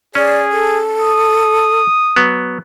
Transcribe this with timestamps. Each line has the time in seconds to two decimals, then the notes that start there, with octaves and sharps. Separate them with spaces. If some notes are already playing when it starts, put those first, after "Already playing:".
0.15 C#4 G#4 D5
0.52 A4
1.02 D#6
2.16 F#3 B3